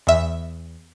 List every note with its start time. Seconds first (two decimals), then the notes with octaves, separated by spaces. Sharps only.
0.07 E2 E5